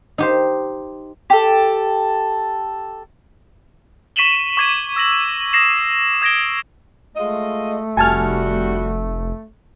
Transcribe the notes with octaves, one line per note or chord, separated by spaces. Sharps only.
D#4 G4 C5
G4 A4
C#6 B6 D#7 E7 F#7 G7
C#6 D6 G#6 B6 D#7 E7
E6 A#6 F#7
D#6 A#6 C7 E7
D#6 G#6 A#6 D7 G7
G#3 A3 F4 D#5
F1 G3 F#4 G#5 A5 F6